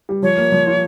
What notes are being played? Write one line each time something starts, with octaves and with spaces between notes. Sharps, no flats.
G3
F3 C#5
A#3
F3
F4